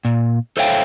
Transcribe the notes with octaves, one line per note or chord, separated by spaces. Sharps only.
A#2
A4 C5 C#5 E5 F5 G5